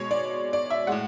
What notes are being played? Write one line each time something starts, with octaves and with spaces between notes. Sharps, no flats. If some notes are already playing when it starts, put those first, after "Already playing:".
Already playing: B2 G#3 C#5
D5
D5
E5
A2 G#3 F#5